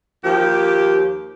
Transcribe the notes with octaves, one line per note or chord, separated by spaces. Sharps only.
D#2 F3 G4